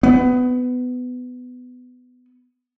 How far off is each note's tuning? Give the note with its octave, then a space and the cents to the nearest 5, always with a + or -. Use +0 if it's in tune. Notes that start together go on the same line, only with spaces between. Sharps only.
B3 +20